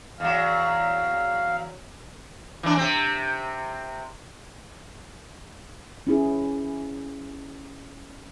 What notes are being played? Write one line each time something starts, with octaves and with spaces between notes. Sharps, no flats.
E2 F#3 F5
E3 D4
C3 C4
C#4 E4 G#4